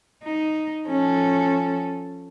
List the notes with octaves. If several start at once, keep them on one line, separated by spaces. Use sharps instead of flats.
D#4
F3 C#4 A4